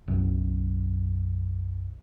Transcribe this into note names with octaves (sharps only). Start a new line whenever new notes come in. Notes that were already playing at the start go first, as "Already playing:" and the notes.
F#1 B1 F#2